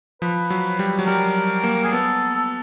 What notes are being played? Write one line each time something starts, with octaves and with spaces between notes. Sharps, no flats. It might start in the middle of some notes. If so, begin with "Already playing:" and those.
F3 B4
F#3
G3
F#3
G3 A#4
A#3
G#4
B3 A4
A4